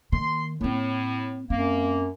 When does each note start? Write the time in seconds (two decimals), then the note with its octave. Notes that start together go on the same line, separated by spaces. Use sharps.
0.12 D#3 A#3 C6
0.61 A2 A#3 C4
1.50 F#2 A#3 C4